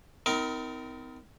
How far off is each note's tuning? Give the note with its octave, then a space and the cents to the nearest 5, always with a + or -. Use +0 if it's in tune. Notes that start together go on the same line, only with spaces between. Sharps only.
C4 -35 D#4 +35 A#4 +0